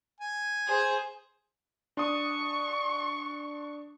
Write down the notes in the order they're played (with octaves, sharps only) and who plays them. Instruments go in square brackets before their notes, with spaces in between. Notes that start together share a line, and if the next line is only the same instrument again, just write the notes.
[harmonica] G#5
[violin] G#4 C5
[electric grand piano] D4 D#6 [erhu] C#6